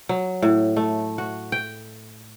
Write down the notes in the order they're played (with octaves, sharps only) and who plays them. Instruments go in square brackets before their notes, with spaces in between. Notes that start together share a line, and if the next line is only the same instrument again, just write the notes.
[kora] F#3
A2
A3
F#4
G5